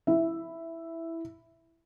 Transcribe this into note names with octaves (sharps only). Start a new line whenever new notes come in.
E4 E5